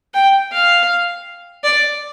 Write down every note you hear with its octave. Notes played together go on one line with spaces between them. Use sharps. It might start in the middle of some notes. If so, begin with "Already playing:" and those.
G5
F5
D5